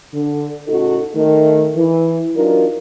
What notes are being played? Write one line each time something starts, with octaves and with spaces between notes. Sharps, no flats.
D3
A2 C#3 D#4 F#4 A4
D#3 A3
E3
E3 F#3 D4 D#4 F4 A#4